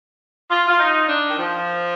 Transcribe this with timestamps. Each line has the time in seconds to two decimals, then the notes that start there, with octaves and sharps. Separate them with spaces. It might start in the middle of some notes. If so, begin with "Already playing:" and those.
0.50 F4
0.68 F4
0.78 D#4
1.08 D4
1.29 D#3
1.37 F3